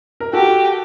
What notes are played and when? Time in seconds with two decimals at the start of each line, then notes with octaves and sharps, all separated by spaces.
0.20 A#4
0.33 F#4 G4 A4